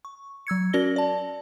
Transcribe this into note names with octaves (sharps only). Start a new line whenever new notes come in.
C#6
F#3 E6 G#6 C#7
C#4 F#4 A#4 D5 A#6 G7
D5 A5